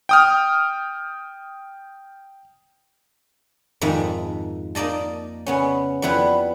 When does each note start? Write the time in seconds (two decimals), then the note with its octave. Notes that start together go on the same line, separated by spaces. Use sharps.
0.09 G5 D#6 F6
3.81 F2 G#2 D#3 E5
4.75 A#3 D#4 D5 D#5 A5
5.46 C#3 B3 C#4
6.02 F2 G3 B3 E4 B4